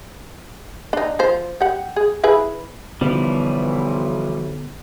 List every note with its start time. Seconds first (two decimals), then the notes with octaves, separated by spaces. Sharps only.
0.93 D4 D#4
1.19 F3 C5
1.61 G4 F#5
1.96 G#4
2.23 E4 G#4 B4
3.01 B1 D3 E3 F3 G3 B3